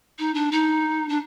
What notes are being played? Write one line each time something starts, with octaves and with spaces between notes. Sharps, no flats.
D#4
D4
D#4
D4